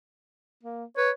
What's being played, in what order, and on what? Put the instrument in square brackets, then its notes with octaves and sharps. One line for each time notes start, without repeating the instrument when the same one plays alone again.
[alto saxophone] A#3
[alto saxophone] B4 [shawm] C#5